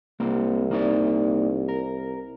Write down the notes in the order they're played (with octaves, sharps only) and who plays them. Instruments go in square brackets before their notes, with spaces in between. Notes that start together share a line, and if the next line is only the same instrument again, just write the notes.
[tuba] C2 [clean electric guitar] A#3 C4
[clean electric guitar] A#3 D#4 D5
A#4